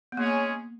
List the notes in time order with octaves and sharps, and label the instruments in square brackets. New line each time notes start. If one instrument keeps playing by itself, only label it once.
[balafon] B3
[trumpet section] G#3 C#4 G#4 C#5 [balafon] A#3